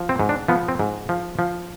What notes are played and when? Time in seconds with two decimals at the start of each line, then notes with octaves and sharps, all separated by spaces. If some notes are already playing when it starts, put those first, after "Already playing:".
Already playing: F3
0.09 C4
0.19 G#2
0.29 D4
0.48 F3 B3
0.68 C4
0.79 G#2
1.09 F3
1.39 F3